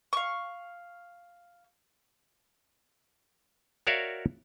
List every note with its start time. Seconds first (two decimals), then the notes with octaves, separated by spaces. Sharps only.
0.13 F5 C#6
3.87 F#4 A#4 C#5 D5 E5 F5